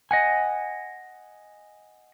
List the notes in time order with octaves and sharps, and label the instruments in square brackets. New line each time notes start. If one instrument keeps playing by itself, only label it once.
[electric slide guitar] D#5 F#5 G#5